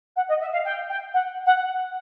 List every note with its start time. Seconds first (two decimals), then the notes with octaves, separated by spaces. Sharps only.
0.16 F#5
0.28 D#5
0.40 E5
0.52 F5
0.64 G5
0.89 G5
1.13 F#5
1.45 F#5
1.62 F#5